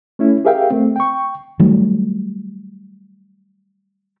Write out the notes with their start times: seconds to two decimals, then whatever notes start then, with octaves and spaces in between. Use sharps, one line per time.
0.19 A3 C#4 E4
0.45 G4 G#4 A#4 E5 F5 G5
0.71 A3 C4
0.96 G5 C#6
1.59 D#3 F#3 G3 A3